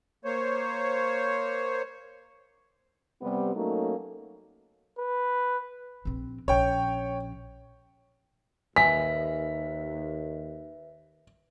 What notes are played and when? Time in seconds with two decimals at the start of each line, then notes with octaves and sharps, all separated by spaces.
0.25 A#3 C5 C#5
3.22 C3 G3 B3
3.55 F#3 A3 A#3 C#4 D#4
4.99 B4
6.05 A#1 C4
6.48 A#1 C#4 C#5 G5
8.76 D#2 B4 E5 G#5 B6